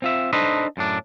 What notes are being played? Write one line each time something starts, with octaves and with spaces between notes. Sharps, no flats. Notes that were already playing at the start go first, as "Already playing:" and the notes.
C4 F4 E5
D4 D#4 A4 B4 C5 D#5
F#2 A2 D4